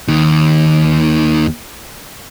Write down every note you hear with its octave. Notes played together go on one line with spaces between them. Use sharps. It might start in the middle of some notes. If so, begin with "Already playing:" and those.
D#2 D#3